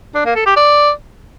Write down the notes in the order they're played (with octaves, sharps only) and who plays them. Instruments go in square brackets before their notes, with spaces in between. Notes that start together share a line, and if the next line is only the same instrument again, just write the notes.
[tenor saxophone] D4
A#3
A4
G4
D5